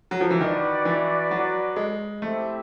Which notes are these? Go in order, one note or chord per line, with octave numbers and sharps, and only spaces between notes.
F#3
F3
E3
D#3 F#4 B4 D5
E3
F#3
G#3
A3 C4 E4 G4 C5 E5